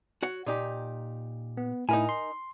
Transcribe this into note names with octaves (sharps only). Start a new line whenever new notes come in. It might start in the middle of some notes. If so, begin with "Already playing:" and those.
F#4 C#5 F#5
A#2 D#4 G4
B3
A2 D#4 E4 A#4 G#5
C6